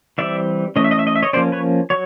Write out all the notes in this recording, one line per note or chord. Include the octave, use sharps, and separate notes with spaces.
E3 G3 C4 D5 E5
E3 A3 C#4 D#5
E5
D#5
E5
D#5
E5
C#5 D#5
F3 A#3 C#4 C5 D5
B4 C#5
F#3 C#5